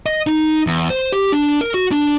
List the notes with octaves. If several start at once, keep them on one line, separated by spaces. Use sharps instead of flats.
D#5
D#4
E2
C5
G4
D4
A#4
F#4
D4